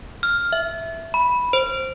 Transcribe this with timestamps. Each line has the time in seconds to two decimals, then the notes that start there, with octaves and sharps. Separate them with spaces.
0.23 F6
0.53 E5
1.14 B5
1.53 C5